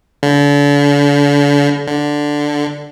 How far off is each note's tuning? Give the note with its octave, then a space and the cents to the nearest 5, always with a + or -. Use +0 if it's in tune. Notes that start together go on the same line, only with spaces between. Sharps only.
D3 -40
D3 +0